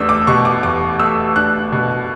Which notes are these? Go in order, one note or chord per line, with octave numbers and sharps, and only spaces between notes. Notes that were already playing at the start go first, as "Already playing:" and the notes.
Already playing: E2 A3 D4 E6
D6
B2 C#6
D6
E2 D6
A3 E6
D4 F#6
B2